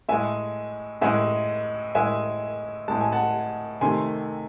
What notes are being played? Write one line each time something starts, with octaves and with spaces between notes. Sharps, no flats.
A2 G#3 E5 G#5
A2 G#3 E5 G#5
A2 G#3 E5 G#5
A2 G#3 A5
G#5
F#5 A5
C3 D#3 A3 G#5 C6